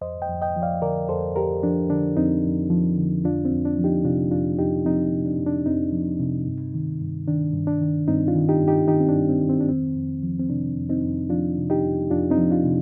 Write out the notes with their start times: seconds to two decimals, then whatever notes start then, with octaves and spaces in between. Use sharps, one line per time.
0.01 F2 C5 D#5
0.22 D#5 G5
0.29 F2
0.42 D#5 G5
0.56 F3
0.62 D5 F5
0.82 D3 A#4 D5
1.09 F2 A4 C5
1.36 F2 G4 A#4
1.63 F3 D4
1.90 D3 D4
2.17 F2 C4 D#4
2.44 F2
2.70 F3
2.97 D3
3.24 F2 D4 F4
3.45 C4
3.52 F2
3.65 D4
3.79 F3
3.84 D#4 G4
4.04 C3 D4 F4
4.31 F2 D4 F4
4.58 F2 D#4 G4
4.85 F3 C4 D#4
5.12 C3
5.26 D4
5.39 F2
5.47 D4
5.66 F2 C4 D#4
5.92 F3
6.19 C3
6.46 G2
6.74 D#3
7.01 G2
7.28 D#3 D4
7.54 G2
7.67 D4
7.81 D#3
8.08 G2 C4 D#4
8.28 D4 F4
8.35 D#3
8.49 D#4 G4
8.62 G2
8.68 D#4 G4
8.88 D#3 D#4 G4
9.00 C4
9.09 D4
9.15 G2
9.29 C4
9.42 D#3
9.49 C4
9.61 D4
9.69 F2 C4
9.96 F2
10.23 F3
10.39 C4
10.49 C3 D4
10.77 F2
10.89 C4 D#4
11.04 F2
11.30 F3 D4 F4
11.58 C3
11.70 D#4 G4
11.84 F2
12.10 F2 D4 F4
12.30 C4 D#4
12.38 F3
12.50 D4 F4
12.64 C3